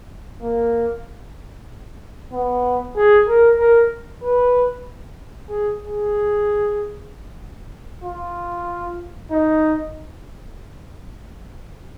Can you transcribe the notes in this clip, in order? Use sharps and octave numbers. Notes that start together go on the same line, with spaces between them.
A#3
B3
G#4
A#4
A#4
B4
G#4
G#4
F4
D#4